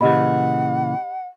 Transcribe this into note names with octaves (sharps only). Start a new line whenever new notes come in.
A#2 C#3 E3 G4 D#5 F#5 B5